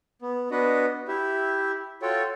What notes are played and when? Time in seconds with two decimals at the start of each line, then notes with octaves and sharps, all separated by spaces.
0.22 B3
0.51 B3 D4 F#4 B4 D#5
1.08 E4 G4 E5
2.02 F4 F#4 A4 C#5 G5